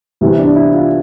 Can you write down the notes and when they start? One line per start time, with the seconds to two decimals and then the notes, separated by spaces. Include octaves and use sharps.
0.21 C2 C3 E3 B3
0.38 D4
0.56 E4
0.73 F4